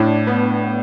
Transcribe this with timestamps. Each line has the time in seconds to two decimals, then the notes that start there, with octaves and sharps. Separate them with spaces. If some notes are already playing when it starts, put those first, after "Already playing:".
Already playing: A2 D4
0.27 B3